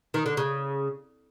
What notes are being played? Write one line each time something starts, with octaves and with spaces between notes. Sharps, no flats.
D#3
D3
C#3